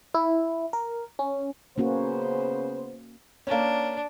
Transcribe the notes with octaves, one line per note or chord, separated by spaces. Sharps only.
E4
A#4
C#4
C#3 A#3 B3 C#4 F#4 C5
A#3 C#4 D4